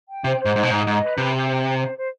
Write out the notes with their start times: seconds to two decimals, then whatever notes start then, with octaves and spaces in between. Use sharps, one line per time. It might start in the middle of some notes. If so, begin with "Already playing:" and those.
0.09 G5
0.24 C3 C5
0.39 C5
0.45 G#2
0.56 G#2 D#4
0.63 B2
0.71 G#2 D#4
0.87 G#2 D#5
1.03 B4
1.18 C3 B5
1.34 G4
1.49 C5
1.65 C5
1.80 C5
1.96 C5